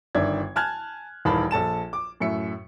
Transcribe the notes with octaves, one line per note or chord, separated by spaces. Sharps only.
G1 D#3 D4 E5 G#6
G#5 A5 F6 F#6 G#6
D#1 D#3 E3 F5 A5 B5
A#1 A4 A5 E7
D6
F#2 A2 E5 C#7